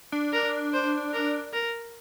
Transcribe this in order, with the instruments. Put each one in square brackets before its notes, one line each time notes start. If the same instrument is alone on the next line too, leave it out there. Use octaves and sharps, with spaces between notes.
[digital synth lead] D4
[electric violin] A#4
C5
A#4
A#4